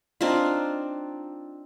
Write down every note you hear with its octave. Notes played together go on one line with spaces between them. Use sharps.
C4 D4 D#4 F4